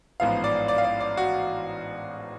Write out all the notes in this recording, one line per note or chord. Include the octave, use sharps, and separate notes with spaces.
A1 G#2 F3 B3 F5
D5
D5
F5
D5
D5
F#4